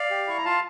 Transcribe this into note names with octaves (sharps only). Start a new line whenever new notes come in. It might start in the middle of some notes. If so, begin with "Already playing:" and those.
Already playing: D5 F5
G4
E4 C#6
A#5
F4 F5 A5